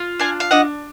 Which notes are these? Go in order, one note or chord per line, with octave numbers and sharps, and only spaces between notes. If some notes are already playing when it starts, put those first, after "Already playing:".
Already playing: F4
D4 F5 G#5
F5
D4 D#5 F#5